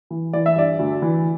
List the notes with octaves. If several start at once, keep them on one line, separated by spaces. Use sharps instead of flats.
E3
E3 D5
E5
G2 D5
D2
E3